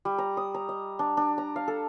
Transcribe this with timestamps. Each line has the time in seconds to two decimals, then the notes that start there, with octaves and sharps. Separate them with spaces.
0.05 G3
0.18 A#5
0.37 D#6
0.55 A#5
0.69 D#5
0.99 D4
1.17 D4
1.38 A#5
1.56 F5
1.68 A4